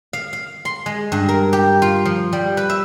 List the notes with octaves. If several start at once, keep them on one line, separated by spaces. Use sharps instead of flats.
F5
F5
C6
G#3
G2
A#4
G4
F4
F3
G3
B4
E5